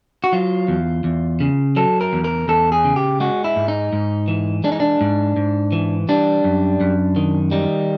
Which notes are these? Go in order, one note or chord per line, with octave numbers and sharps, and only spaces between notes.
F#4
F#3 F4
E2
E2
C#3
F#3 A4
A#4
E2
A#4
E2 A4
G#4
C#3
G4
G#3 F#4
E4
G#2
D#4
G#2
E3
G#3 D4
D#4
D4
G#2
G#2
E3
G3 D4
F#2
F#2
D#3
G3 D#4